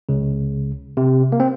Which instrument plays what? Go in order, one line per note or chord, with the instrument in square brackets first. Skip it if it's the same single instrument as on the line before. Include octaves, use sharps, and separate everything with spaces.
[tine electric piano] C#2 C#3
C3
A#3
C4